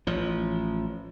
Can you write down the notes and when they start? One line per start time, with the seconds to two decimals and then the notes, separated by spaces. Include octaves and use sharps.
0.07 A1 F3